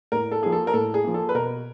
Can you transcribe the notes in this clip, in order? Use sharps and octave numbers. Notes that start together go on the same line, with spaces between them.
A2 A#4
A4
F3 A#3 G#4
A4
A#4
A2 A4
G#4
F3 A#3
A4
B4
B2 A#4